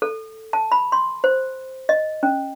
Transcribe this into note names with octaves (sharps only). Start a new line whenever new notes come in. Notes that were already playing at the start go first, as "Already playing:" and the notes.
A4
A5
B5
C6
C5
D#5
C#4